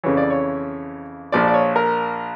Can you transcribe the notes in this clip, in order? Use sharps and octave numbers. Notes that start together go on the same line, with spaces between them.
F2 C#3 E3 C#5
D5
C#5
A#1 A#2 F3 D5
D5
C#5
A#4